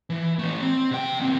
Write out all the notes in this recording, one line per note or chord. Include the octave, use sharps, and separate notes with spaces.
E3
E3 A3
C4
C3 G5
D2 C4